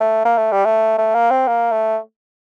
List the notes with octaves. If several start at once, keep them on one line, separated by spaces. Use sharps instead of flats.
A3
A#3
A3
G3
A3
A3
A#3
C4
A#3
A3